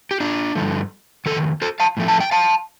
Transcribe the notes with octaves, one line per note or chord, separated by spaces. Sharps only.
G4
D4 F4
G2 D3 F3 A3
F2 D#3 A4
A4 C5
F5 A5
A2 F3 A3
A5
G5
F5 A5